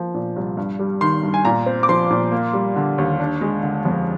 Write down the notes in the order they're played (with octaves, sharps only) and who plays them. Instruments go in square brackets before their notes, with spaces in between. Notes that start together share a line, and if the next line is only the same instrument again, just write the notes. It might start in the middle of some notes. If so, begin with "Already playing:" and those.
Already playing: [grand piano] F3 A#3
A#2
C2
G2
G3
D#3 C6
G2
G#5
A#2 A#5
C4
D6
F3 C6
A#2
A#3
G3
D3
D#2
D4
G#3
D3
F2